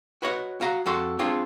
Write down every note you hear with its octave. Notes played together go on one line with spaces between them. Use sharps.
F#4 B4 C#5 D#5 F5 F#5
F#4 F5 A#5
F2 F#4 A4 C6
C4 D4 F4 G#4 C5